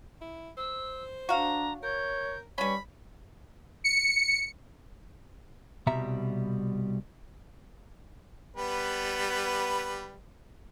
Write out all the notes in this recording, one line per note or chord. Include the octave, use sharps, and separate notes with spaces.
E4
C5 E6
D4 F#4 F5 A#5
A#4 C#5 G6
G3 C#4 B4 B5 C#6
C#7
C2 B2 G3 E5 A#5
G3 B3 B4